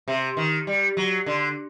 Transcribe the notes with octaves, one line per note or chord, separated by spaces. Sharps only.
C3
D#3
G3
F#3
D3